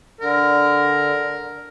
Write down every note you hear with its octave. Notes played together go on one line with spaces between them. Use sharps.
D3 A#4